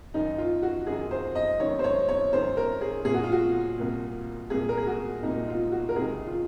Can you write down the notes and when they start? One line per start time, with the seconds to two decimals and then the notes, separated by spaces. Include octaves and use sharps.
0.14 F#2 D#3 D#4
0.38 F4
0.62 F#4
0.87 F#2 D#3 G#4
1.11 C5
1.35 D#5
1.60 F#2 D#3 C#5
1.79 C5
1.84 C#5
2.09 C#5
2.32 F#2 D#3 C5
2.57 A#4
2.81 G#4
3.05 C2 A#2 G#4
3.14 F#4
3.23 F4
3.32 F#4
3.78 C2 A#2
4.50 C2 A#2 G#4
4.69 A#4
4.77 G#4
4.87 F#4
5.23 C2 A#2 D#4
5.48 F4
5.72 F#4
5.89 A#4
5.96 C#2 C3 D#3 G#4
6.27 F4